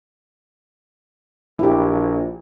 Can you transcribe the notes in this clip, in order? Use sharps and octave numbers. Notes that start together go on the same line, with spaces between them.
A#1 E4 G4